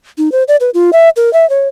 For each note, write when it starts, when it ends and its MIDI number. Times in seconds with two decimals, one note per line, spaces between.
0.18 0.31 63
0.32 0.43 72
0.48 0.56 74
0.60 0.70 71
0.74 0.90 65
0.93 1.09 76
1.16 1.32 70
1.33 1.48 76
1.49 1.68 73